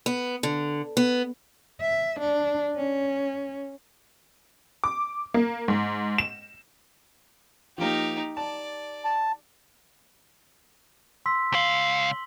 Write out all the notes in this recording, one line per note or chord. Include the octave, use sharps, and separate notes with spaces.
B3
D3
B3
E5
D4
C#4
D6
A#3
G#2
E7
F3 A#3 D#4 G4
D5 A5
A5
C6 E6 B6
C#2 F5 B6 F#7 G7